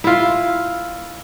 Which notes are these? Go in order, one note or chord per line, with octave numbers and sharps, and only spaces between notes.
E4 F4